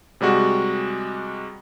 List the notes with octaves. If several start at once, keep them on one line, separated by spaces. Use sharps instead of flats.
C3 G3 G#3 F#4